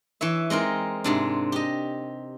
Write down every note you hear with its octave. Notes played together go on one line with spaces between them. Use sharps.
E3 C#5 E5
G#3 C4 D#4 A#4
G#2 C3 D4
G4 D#5